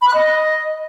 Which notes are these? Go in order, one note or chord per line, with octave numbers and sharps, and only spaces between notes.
B5
F#6
D#5